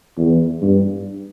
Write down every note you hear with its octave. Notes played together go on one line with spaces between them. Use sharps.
E2
G2